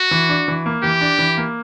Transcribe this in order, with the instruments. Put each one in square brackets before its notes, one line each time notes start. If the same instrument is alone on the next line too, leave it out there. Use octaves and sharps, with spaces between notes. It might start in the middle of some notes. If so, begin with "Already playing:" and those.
Already playing: [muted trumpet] F#4
[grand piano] E3
D4
E3
A#3
[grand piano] E3 [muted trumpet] G4
[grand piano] D4
E3
A#3